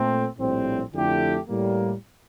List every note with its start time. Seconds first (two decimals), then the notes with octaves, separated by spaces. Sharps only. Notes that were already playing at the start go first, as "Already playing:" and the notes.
Already playing: A#2 A3 C4
0.38 A#1 A2 G3 C4
0.93 F2 D3 A3 E4 G4
1.48 A2 G3 A#3